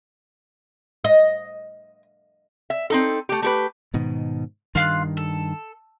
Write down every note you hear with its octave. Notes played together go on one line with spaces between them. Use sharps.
D#5
E5
C4 D#4 A4
A3 G4
A3 G4 B4
G#2 B2 D#3
G2 D#3 F4 F5 F#6
A4